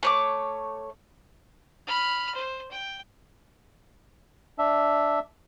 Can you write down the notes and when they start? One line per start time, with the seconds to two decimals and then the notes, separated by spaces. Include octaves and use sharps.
0.03 A3 C#5 D6
1.87 B5 F6
2.34 C5
2.71 G5
4.58 D4 E5